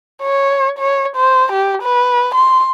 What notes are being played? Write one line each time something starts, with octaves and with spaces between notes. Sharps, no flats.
C#5
C#5
C5
G4
B4
C6